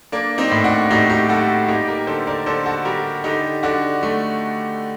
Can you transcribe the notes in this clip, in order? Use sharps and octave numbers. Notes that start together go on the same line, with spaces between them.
A#3 D4
C4 D#4
A2
D4 F#4
A2 D#4 G4
D#4 G4
G3 F#4 A4
A#3 D#4 G4
G4 A#4
D3 A4 C5
A#4 D5
D3 A4 C5
F#4 A4
G3 G4 A#4
D3 D#4 G4
D3 D4 F#4
A3